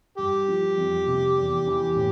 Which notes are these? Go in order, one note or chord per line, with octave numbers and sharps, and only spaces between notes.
G2 G4
F3
F2
C3
E2
E3
A2